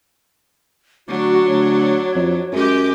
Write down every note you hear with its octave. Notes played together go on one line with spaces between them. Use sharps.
D2 F#3 D4 F#4
D2 C#5
F2
F#2 G#3 G4